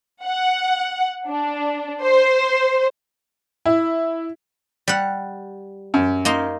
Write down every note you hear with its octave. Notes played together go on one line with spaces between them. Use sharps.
F#5
D4
C5
E4
G3 F#5
F#2
A#3 D#4 C6